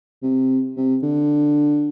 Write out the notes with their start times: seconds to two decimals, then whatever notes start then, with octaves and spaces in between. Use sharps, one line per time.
0.22 C3
0.77 C3
1.03 D3